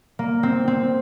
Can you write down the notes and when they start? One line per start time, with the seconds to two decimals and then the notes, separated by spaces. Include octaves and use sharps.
0.19 A#3
0.43 C4
0.68 C4